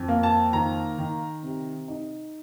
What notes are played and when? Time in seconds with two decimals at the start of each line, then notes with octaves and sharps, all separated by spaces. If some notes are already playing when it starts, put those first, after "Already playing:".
Already playing: F2
0.08 A#3
0.23 A5
0.53 D#3 A#5
0.98 D#3
1.43 C3
1.88 D#4